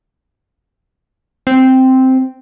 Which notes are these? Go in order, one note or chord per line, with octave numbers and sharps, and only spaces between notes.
C4